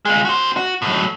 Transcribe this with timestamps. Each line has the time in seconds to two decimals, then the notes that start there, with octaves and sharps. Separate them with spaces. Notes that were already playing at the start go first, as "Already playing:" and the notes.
0.05 G#3 F4
0.25 F#4 C5
0.57 F#4
0.82 A2 F#3